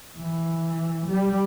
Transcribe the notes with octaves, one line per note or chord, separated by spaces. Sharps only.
E3
G3